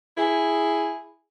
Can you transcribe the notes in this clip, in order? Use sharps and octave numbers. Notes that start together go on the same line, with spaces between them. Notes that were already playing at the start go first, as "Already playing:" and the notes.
E4 G#4